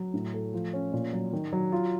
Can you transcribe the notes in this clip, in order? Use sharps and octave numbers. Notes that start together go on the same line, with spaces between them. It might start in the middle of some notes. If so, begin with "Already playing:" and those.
Already playing: F#3
A2
A3
F3
C#4
A#2
F#3
D#3
F#3
F4